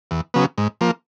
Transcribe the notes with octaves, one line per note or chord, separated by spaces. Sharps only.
E2
C#3 F#3 B3
G#2
F3 A#3